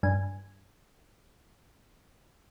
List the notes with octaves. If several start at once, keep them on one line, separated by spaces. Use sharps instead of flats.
G2 G#5